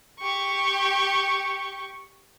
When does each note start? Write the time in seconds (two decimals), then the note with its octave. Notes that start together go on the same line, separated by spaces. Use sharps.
0.20 G4 C#6